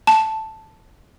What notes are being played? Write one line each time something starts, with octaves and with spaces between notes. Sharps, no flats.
A5